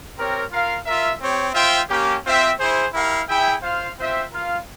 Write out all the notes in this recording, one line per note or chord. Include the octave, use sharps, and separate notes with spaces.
C4 G4 A#4 C#5
F4 A#4 F5
F4 A#4 E5
C4 G4 C#5
F4 C5 E5 G5
A#3 C#4 G4
C4 F4 C5 E5 G5
E4 G#4 C5
E4 G4 A#4 F5
E4 G#4 E5 G5
F4 C5 F5
C4 F4 C5 E5 G5
F4 A#4 F5